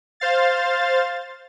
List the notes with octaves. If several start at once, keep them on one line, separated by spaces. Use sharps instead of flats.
C5 F5 A6